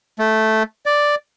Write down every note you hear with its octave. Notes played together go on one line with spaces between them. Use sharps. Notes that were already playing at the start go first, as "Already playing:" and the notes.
A3
D5